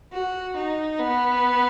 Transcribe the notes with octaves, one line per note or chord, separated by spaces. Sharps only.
F#4
D#4
B3